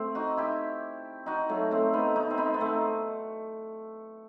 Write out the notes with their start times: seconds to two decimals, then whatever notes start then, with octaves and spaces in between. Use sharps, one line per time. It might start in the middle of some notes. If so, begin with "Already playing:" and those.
Already playing: A3 C4
0.15 D#4 F#4
0.37 E4 G4
1.26 D#4 F#4
1.49 F#3 A3
1.71 A3 C4
1.93 B3 D#4
2.16 D#4 F#4
2.30 C4
2.38 B3 D#4
2.54 B3
2.60 A3 C4